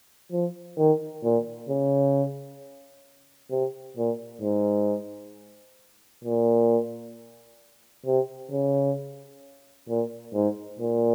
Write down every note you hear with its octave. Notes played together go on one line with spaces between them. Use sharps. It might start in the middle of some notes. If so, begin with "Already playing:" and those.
F3
D#3
A#2
C#3
C3
A#2
G#2
A#2
C3
C#3
A#2
G#2
A#2